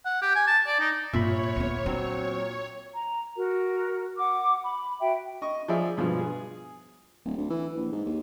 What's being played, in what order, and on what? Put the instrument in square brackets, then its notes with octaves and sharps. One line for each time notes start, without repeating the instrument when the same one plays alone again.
[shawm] F#5
G4
G#5
A5
D5
D#4
[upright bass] G2 [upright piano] A#2 [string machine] C#5 [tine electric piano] E5 B5
[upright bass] D2 B3
[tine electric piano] F#3 C4 [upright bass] D4
[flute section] A#5
F#4 A#4
F#5 D6
B5
F#4 E5 G5
[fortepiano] D#5 C#6
F3 G#4 D5 E5
G2 B2 F3 G#3
G#4
[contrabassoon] D1
D2
E3
A#1
G#2
D#2